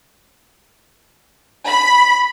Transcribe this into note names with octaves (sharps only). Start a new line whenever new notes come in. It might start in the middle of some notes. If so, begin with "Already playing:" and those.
B5